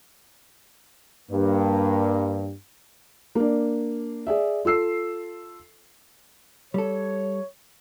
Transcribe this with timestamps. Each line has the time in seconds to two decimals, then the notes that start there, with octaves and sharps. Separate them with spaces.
1.31 G2 A#3
3.35 A#3 D4
4.27 G#4 D5 E5
4.65 F4 A4 E6 C7
6.74 G3 A4 C#5